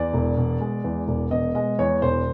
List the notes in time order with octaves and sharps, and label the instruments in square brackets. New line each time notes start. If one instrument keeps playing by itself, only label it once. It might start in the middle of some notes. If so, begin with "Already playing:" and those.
Already playing: [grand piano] E2 D5
E1
B2
G#3
E2
E1
B2 D#5
G#3 D#5
E2 C#5
E1 C5